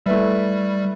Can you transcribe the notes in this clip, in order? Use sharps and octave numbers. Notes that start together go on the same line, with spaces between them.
G3 A3 E4 B4 E5